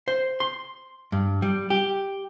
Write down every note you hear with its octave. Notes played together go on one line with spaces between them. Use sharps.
C5
C6
G2
G3
G4